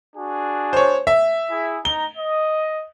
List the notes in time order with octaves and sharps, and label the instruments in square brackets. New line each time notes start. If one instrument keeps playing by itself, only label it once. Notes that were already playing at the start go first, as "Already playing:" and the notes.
[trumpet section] D4 F#4 G#4
[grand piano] C5 C#5
E5
[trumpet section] E4 G#4
[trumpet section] D#4 A#5 [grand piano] G7
[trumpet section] D#5